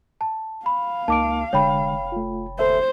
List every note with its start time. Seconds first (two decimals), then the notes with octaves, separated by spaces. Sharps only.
0.21 A5
0.66 F5 B5
1.08 C#2 A#3 D#4 A5 D6 D7
1.53 F1 D3 G#3 C#5 G5 B5
2.12 A3 F4
2.59 D2 A4 C5 E5